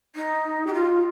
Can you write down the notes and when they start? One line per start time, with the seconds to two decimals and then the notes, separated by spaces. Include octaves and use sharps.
0.15 D#4
0.66 G4
0.73 F4